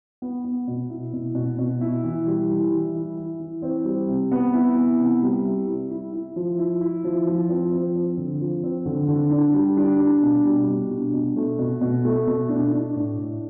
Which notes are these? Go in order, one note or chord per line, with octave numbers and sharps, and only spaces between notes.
B3
B3
B2
E4
B2
B2
B2
E4
E3
G3
E4
E3
E4
E4
E3
C4
G3
C3
B3
E4
B3
C3
G3
E4
E4
E4
E4
F3
E4
E4
F3
F3
C4
F3
C4
D3
F3
C4
D3
D3
D4
G3
D4
D4
B2
G3
B2
D4
B2
A3
B2
B2
A3
B2
D4
D4
A2
A2